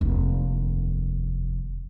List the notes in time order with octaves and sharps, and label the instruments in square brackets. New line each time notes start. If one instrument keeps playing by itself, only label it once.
[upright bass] F1 D#2